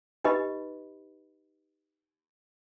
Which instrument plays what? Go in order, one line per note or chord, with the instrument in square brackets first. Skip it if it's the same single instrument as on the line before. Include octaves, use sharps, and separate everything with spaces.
[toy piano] D#4 G4 B4 D#5 B5